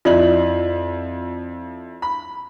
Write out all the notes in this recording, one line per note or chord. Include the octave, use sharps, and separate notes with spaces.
F2 E4 F4 D5 D#5 F#7
B5